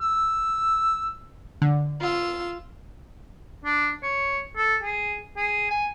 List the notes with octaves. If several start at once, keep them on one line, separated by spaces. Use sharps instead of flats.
E6
D3
F4 E6
D4
C#5
A4
G#4
G#4
G#5